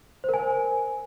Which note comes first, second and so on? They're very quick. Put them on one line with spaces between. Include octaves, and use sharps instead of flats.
C5 A#4 G#5